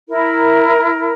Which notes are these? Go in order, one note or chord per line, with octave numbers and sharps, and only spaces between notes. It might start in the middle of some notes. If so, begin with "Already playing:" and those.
E4 A#4